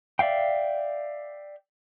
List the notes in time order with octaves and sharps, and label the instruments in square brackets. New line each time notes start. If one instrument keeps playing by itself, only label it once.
[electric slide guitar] D5 E5 F5 G5